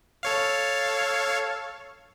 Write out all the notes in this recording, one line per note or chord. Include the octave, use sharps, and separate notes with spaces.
A4 C#5 F5